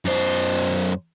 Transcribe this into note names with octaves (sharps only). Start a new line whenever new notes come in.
F#2 C5